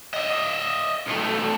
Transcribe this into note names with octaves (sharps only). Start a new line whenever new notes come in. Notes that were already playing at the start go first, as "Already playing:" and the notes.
D#5 E5
B1 A3